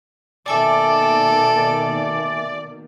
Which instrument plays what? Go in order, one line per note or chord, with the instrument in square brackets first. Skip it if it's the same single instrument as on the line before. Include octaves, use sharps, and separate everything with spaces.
[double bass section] B2 D#3 A#3 [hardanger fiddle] A4 [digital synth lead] D5 [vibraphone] E5 G#5 D6